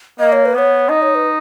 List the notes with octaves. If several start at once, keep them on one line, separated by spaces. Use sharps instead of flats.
A#3 D#5
C#5
B4
B3 C#5
D#4 D#5
C#5
B4